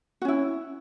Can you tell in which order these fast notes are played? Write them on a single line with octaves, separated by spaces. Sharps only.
F#4 C#4 E4